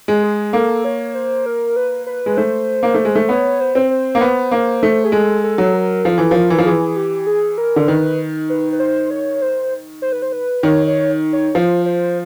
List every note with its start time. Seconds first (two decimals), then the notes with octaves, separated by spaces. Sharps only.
0.08 G#3
0.23 G#4
0.53 A#3 A4
0.85 C#5
1.15 C5
1.46 A#4
1.76 B4
2.07 B4
2.26 G#3
2.37 A3 C5
2.83 A#3
2.94 A3
3.05 G#3
3.15 A3
3.29 B3 C#5
3.60 C5
3.75 C4
3.91 C5
4.15 A#3
4.21 B3
4.51 A#3
4.83 A3
5.04 G#4
5.12 G#3 A4
5.44 A4
5.58 F#3
5.74 A#4
6.05 F3 A4
6.18 E3
6.31 F3 A#4
6.50 E3
6.58 F3
6.66 E3 G#4
6.96 G4
7.27 G#4
7.58 A#4
7.76 D3
7.87 D#3 B4
8.50 B4
8.72 B4
8.80 C5
9.10 C#5
9.42 C5
10.02 C5
10.12 B4
10.22 C5
10.32 B4
10.63 D#3 C#5
10.87 C#5
11.33 C#5
11.55 F3 C5
11.86 C5